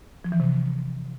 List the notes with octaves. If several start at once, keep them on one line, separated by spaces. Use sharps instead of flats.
F3
E3
C3